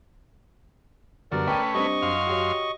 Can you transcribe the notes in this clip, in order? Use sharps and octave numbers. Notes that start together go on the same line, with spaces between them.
F#2 D3 G3 B3 A#4 D5
A3 C#4 B4 G5 D#7
G3 C4 D4 D#5 C#6
F#2 F5 C6
F#4 G4 C#5